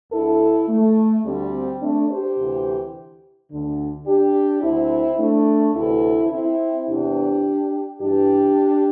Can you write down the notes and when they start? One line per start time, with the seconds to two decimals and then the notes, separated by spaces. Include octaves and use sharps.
0.12 D2 D3 E4 A4
0.68 A3
1.25 D2 D3 G3 C4
1.81 A3 D4
2.09 G4 C5
2.37 D2 C3 E3
3.50 D2 D3
4.06 D4 G4
4.62 D2 D3 C4 E4
5.19 A3 D4
5.75 D2 C3 E3 E4 A4
6.31 C4 E4
6.88 E2 C3 E3 D4 G4
8.00 G2 E3 D4 G4